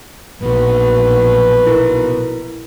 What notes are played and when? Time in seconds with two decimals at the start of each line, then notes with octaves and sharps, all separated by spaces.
0.42 A#1 B2 F#3 B4
1.67 E4 A#4